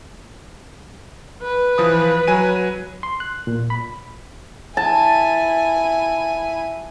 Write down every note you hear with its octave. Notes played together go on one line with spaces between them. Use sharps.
B4
E3 F3 D#6
F#3 G#5 D#7
C6
F#6
A#2
B5
E4 G#5 A5